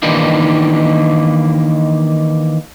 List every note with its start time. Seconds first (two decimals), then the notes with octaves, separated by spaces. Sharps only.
0.02 D#3 E3 A#3 D4 D#4